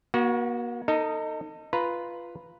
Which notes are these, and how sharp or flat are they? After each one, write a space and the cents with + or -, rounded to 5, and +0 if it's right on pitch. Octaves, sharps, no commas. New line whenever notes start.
A#3 +40 F#4 +0
D#4 +0 A4 +35 D#5 +0
F4 -10 B4 +0 A#5 +0